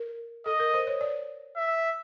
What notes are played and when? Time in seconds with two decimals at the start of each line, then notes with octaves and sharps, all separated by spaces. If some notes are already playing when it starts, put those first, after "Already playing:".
Already playing: A#4
0.46 A4 D#5
0.60 A#4
0.74 C5
0.87 C#5
1.01 D5
1.56 E5